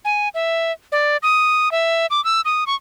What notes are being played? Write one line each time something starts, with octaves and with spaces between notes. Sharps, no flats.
G#5
E5
D5
D#6
E5
D6
E6
D#6
C#6